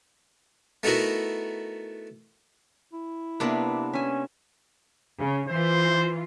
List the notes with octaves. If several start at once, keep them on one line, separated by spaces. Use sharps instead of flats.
A3 B3 D#4 E4 F#4 A#4
E4
C3 A#3 B3 D4 A#4 B4
C#4 E5 G#5
C#3
E3 F4 C5